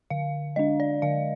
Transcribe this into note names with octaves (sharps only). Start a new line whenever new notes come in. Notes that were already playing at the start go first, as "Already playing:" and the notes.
D3 F5
G#3 D4 D#5
D5
D3 F5